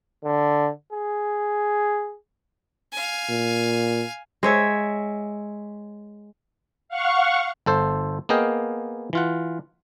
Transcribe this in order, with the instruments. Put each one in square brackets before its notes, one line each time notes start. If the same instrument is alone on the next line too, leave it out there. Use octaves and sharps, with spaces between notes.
[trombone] D3
G#4
[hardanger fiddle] F5 G#5
[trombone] A#2
[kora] G#3 C#5 E5
[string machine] F5 F#5 C#6
[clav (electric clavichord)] G1 A4 C5
A#3 B3 G#4 D#5 F5 G5
E3 F4 F#5